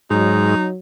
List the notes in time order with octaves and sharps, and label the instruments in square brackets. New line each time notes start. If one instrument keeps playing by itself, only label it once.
[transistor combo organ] G#2 [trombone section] F#3 [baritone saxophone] D#4